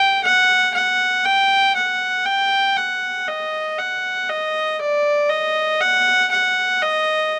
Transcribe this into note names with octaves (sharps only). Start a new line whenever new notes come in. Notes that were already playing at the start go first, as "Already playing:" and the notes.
Already playing: G5
F#5
F#5
G5
F#5
G5
F#5
D#5
F#5
D#5
D5
D#5
F#5
F#5
D#5